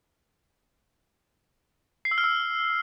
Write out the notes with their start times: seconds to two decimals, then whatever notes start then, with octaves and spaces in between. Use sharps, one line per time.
2.05 C7
2.11 E6
2.18 F6
2.24 E6